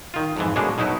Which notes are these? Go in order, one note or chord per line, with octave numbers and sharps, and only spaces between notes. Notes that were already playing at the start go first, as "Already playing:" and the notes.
D#3 F4
F2 G#2 E3
B2 G#3 A#3 C#4 D4 G#4
B2 F#3 D#4 E4